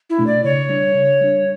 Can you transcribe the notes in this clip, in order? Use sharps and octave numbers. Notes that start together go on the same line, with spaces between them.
E4
B2 A3 D4
D5
C#3 C#5
G3 D4
C#3
G3 D4